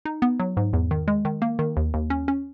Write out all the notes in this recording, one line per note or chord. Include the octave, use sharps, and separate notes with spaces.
D#4
B3
F#3
G#2
E2
D#3
G#3
D#3
A#3
D#3
D#2
D#2
C#4
C#4